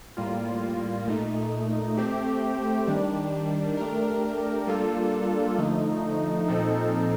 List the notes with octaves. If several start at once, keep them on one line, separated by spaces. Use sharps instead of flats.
A2 G3 A#3 F4
A#2 A3 D#4
A3 C4 G4
D#3 G3 D4
A3 D4 G4 A#4
G3 A#3 D4 F4 A4
D3 F3 A3 D#4
A#2 F3 C4 D#4 A4